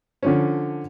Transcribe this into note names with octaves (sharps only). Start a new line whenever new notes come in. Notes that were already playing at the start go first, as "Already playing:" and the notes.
D3 F3 C#4